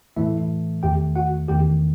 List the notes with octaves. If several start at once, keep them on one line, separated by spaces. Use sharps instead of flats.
A2 E3 A3 E4 E5
E2 D#3 A3 G4 G5
F#4 F#5
E2 D#3 A3 G4 G5